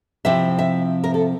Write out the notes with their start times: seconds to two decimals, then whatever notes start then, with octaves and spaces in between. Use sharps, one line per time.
0.25 C3 F3 C4 E4 E5
0.59 E5
1.04 A#4
1.14 A4